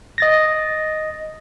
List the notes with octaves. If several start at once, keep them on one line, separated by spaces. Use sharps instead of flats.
D#5 A6 A#6